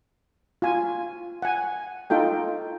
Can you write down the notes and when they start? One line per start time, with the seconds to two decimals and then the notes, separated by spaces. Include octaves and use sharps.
0.62 F4 G#5
1.42 F#5 G#5
2.10 D#4 F4 A4 G5